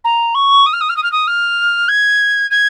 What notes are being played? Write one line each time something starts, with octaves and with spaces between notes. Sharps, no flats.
A#5
C#6
D#6
F6
D#6
F6
D#6
F6
D#6
F6
G#6
G#6